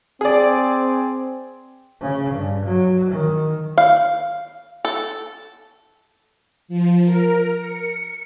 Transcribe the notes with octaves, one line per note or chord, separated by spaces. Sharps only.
C4 G#4 D5
C#3
G2
F#3
D#3
F5
A4
F3
A#4
C#7